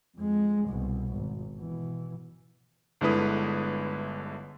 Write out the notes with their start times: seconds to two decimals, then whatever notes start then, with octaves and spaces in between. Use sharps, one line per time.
0.16 F2 G#3
0.66 C2 B2
1.13 G#1
1.56 B2 E3
3.01 G1 D3 G#3 E4 B4 D#6